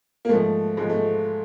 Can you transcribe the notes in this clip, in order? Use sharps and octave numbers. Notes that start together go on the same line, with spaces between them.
A#3
G#2 F3 A3
G#2 F3 G#3
A3